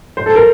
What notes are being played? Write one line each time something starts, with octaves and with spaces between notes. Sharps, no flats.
C5
A4
A#4